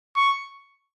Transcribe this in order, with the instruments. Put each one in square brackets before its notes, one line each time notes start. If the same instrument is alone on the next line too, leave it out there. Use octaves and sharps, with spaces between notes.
[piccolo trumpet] C#6